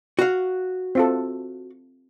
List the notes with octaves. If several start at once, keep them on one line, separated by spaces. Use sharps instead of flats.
F#4 F5
C4 F4 A4